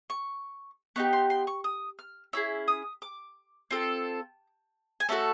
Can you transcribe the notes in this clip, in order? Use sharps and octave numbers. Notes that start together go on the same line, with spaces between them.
C#6
B3 D#4 G4 C#6
C6
C6
C#6
D#6
F6
C#4 E4 G#4 E6
D#6
D6
C4 F4 A4
G#5
A3 C#4 F#4 A4 A5